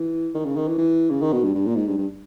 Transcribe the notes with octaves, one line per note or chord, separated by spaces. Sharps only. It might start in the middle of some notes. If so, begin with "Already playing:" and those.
Already playing: E3
D#3
C#3
D#3
E3
E3
C#3
D#3
B2
G2
G2
A#2
G#2
G2
G2